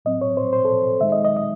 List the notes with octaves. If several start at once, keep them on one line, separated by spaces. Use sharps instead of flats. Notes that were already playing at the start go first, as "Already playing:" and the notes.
A2 F#3 C4 D#5
C#5
C5
C5
A4
D#3 G#3 D#4 E5
D#5
D#5
D#5